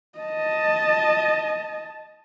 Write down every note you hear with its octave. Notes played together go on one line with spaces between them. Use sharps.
D#5 A5